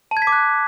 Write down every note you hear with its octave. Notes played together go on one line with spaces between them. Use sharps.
A5
G#6
B6
D6
F#6